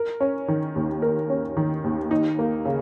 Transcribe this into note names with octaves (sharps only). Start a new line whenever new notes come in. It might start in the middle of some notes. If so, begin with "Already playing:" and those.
Already playing: A#4
C#4
D#3
D#2
A#4
C#4
D#3
D#2
D#4
A#3
C#3